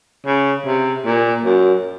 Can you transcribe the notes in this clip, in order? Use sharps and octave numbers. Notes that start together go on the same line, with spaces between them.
C#3
C3
A#2
F#2